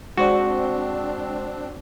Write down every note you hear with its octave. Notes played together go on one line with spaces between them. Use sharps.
G#3 C4 D4 F#4 C5 D5